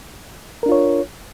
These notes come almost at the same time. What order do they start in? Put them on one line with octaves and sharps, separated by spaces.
A#4 D4 F4 C#5